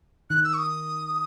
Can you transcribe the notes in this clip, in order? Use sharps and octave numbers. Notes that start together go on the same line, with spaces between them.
D#3 F#6
E6
C#6
D#6